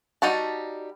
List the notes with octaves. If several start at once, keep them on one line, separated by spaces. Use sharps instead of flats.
G3 D#4 F#4 A5